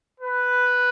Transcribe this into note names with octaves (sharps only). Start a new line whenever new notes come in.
B4